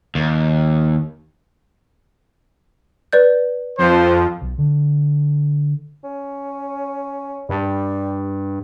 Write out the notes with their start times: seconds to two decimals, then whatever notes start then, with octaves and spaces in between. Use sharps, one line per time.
0.15 D#2
3.13 B4 D5 G6
3.78 F2 F3 C5
4.42 B1
4.58 D3
6.04 C#4
7.49 G2 G3